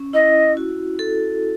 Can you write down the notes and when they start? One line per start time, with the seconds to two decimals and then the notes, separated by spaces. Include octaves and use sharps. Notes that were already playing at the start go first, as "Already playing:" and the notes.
Already playing: C#4
0.13 E4 D#5
0.57 F#4
0.99 A4